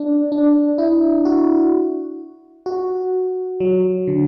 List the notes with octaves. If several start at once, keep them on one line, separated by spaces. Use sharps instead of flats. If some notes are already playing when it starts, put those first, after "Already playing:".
Already playing: D4
D4
E4
F#4
F#4
F#3
D3